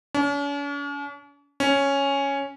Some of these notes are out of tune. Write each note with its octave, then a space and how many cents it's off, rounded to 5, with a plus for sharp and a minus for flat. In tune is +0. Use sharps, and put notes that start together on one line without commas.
C#4 +45
C#4 +0